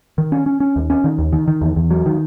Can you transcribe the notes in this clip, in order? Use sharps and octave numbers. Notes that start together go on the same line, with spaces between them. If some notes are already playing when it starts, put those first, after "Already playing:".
D#3
C#4
C#4
C#4
D#2
C#4
D#3
D#2
D#3
D#3
E2
E2
F#3
D#3